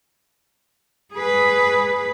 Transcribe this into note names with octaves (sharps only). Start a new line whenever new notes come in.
G#4 B4